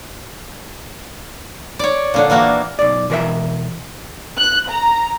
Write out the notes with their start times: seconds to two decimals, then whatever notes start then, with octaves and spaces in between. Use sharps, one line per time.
1.79 C#5 D5
2.14 A#2 D3 D4
2.30 A#2 E3 A#3 F#4
2.79 B1 D5
3.10 B2 E3 A#4 C5 E5
4.38 F#6
4.70 A#5